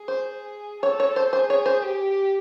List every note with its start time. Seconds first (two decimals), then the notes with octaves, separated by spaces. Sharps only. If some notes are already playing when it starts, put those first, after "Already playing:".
Already playing: G#4
0.08 C5
0.83 A4 C#5
1.00 C#5
1.16 C5
1.32 G#4 C5
1.50 C#5
1.66 C5
1.83 G4